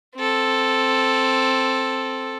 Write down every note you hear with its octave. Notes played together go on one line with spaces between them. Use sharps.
C4 A4